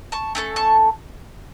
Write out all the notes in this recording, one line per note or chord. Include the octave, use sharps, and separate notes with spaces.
A5 C#6
A3 C#4 A4
A5 C#6